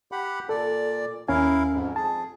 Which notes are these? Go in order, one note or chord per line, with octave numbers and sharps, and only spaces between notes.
G4 F#5 B5
A#2 A4 D5
D#2 C#4 E4 A#4 F5 G#5
F2 G#2
F2 G#4 A5